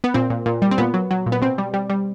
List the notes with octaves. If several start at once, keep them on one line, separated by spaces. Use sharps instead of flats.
B3
A#2 C4
A#2
A#2
G3
C4
A#2 B3
F#3
F#3
A#2
B3
B2 C4
G3
G3
G3